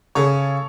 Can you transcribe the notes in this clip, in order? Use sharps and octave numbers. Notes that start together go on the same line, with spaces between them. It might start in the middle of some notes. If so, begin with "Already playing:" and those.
C#3 A4 C#5